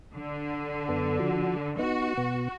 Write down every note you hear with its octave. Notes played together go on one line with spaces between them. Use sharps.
D3
F#2 B3 A4
F3 F#4
B3 D#4 F#4
B2 B3